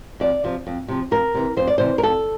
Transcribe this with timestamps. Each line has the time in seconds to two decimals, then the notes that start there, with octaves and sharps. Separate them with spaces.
0.20 F2 D5
0.44 C3 F3
0.67 F2
0.88 C3 F3
1.11 F2 A#4
1.34 C3 E3
1.57 F2 C5
1.67 D5
1.78 C3 E3 C5
1.98 A#4
2.02 F2 A4